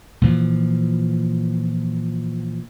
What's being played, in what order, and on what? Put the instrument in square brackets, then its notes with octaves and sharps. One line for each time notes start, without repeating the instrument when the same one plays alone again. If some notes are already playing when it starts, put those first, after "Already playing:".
[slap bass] A#2 E3 F3